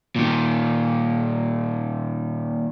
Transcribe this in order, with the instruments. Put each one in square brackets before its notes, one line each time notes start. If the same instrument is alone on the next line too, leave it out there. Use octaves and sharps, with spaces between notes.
[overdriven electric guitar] A#2 D#3